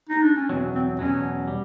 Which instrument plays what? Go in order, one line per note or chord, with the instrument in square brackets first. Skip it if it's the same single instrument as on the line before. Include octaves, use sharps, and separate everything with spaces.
[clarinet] D#4
D4
C#4
[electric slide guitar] E2 B2 F#3 [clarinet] C4
[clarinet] C4
[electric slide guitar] E2 B2 F#3 [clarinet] C#4
[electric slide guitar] G3